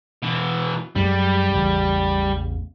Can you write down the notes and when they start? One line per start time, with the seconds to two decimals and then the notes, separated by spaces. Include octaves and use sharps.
0.23 B2 E3
0.96 F#2 G3 G#3
1.54 A1 E2 C#3